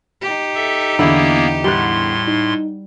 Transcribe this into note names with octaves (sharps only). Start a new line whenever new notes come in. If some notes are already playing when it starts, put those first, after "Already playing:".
D#4 G4
A4 E5
E2 D3 A#3 B3 E4 E5
A2 G3 F#5 C6
D#4